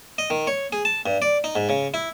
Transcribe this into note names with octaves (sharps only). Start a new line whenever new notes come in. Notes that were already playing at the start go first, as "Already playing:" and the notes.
D#5
D#3
C#5
G#4
A5
G2
D5
D#4
G#2
C#3
E4